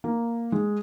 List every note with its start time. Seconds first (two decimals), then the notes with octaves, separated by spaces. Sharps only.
0.04 A#3
0.52 G#3